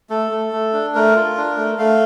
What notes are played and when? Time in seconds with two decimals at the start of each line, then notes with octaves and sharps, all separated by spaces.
0.10 A3 A4
0.31 A3
0.53 A3
0.73 D4
0.95 A3 A#4
1.16 F4
1.37 D4
1.57 A3
1.78 A3 F5